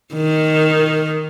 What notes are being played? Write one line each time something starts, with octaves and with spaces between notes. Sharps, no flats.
D#3